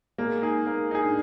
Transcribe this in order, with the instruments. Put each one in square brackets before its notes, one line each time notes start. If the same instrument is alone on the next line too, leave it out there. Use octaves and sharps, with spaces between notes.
[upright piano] G#3 [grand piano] A#3
[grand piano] D#4 G#4
A#3
D#4 G#4
[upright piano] D4